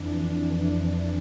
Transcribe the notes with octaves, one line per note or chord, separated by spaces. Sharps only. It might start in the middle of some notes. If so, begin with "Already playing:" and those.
Already playing: F2 E3 D4